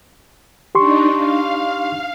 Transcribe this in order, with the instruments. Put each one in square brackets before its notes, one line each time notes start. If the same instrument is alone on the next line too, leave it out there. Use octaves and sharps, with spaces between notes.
[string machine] D4 D#4 [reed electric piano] G4 C6 C#6
[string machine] F5